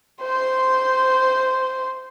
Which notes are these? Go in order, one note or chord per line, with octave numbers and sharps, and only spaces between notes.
C5 C6